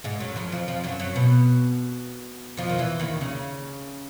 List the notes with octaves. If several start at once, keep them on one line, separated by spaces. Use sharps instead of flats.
G#2 G#3
F#2 F#3
F2 F3
F2 F3
F2 F3
F#2 F#3
F#2 F#3
B2 B3
F2 F3
D#3
E2 E3
D#2 D#3
C#3